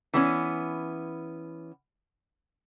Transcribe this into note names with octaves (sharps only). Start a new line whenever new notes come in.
E3 B3 C#4